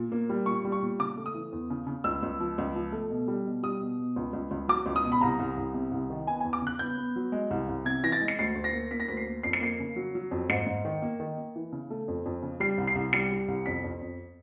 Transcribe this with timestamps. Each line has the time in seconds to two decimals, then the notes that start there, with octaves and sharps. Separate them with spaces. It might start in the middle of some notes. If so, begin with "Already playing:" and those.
Already playing: A#2
0.12 A#3
0.29 G3
0.46 A#2 C#6
0.65 G3
0.72 C#6
0.82 A#2
0.99 C#3 D6
1.17 A3
1.26 D#6
1.34 E3
1.52 E2
1.70 C#3
1.87 C#3
2.04 C#2 E6
2.23 C#2
2.40 F3
2.58 C#2
2.75 F3
2.92 A3
3.10 B2
3.28 G3
3.46 B2
3.63 G3 D#6
3.81 B2
3.99 B2
4.16 C#2
4.33 C#2
4.51 C#2
4.68 F#3 D6
4.86 C#2
4.96 D#6
5.04 B2
5.12 B5
5.21 C2 A#5
5.39 C2
5.57 C2
5.74 C3
5.92 C2
6.10 D#3
6.27 B3 G#5
6.40 G#5
6.45 E2
6.53 D6
6.62 C#3 F#6
6.79 B3 G6
6.98 B3
7.16 F#3
7.32 G#3
7.51 C2
7.69 C2
7.85 C3 G#6
8.03 E3 A#6
8.12 A6
8.21 G#3
8.28 C#7
8.39 D2 C7
8.55 D2
8.64 A#6
8.73 A#3
8.91 A#3 B6
9.00 A#6
9.08 D2 B6
9.17 C7
9.27 A#3
9.43 F2 C7
9.53 C#7
9.61 A#3 C7
9.80 C#3
9.96 F#3
10.15 F#3
10.31 F2
10.49 G#2 C#7
10.67 G#2
10.85 D#3
11.02 A#3
11.20 D#3
11.38 A#3
11.56 E3
11.72 C#3
11.90 A3
12.08 F2
12.26 F2
12.43 C#3
12.60 G3 C7
12.78 C2
12.87 C7
12.95 C2
13.13 G3 C#7
13.32 G3
13.48 C2
13.66 F2 B6
13.84 F2
14.01 F2